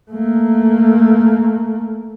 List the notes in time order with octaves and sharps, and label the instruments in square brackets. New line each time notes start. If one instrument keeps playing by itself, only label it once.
[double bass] A3 A#3